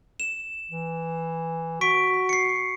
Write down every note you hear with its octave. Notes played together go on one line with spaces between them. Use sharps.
E7
E3
F#4 C#6 B6 D7
C7 C#7